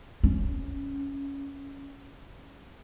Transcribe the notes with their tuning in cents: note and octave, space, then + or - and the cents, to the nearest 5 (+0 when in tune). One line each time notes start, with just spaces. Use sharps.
C#4 +5